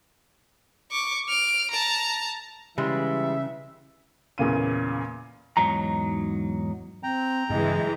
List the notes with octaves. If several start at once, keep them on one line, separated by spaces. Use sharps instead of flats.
C#6 D6
F6 D7
A5 A#5
C#3 E3 G3 G#3 E5
E2 A#2 C#3 D#7
E2 G#2 F#3 D#4 A#5
C4 G5 A#5
G2 C#3 E3 G#3 D#5